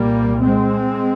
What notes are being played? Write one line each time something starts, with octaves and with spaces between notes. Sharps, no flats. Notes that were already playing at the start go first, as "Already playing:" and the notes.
Already playing: C2 A#2 G3 A#3
G#3 C4